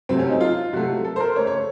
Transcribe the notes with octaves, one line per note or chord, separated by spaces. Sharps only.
C3 F#3 A3 C4
C#4
D#4
F4
C3 F#3 A3 F#4
A4
C5
A#4
C#3 A3 C#5
C#5